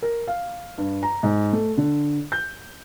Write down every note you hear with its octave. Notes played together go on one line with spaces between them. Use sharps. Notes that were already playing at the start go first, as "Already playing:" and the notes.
A#4
F5
G2
A#5
G#2
A3
D3
G6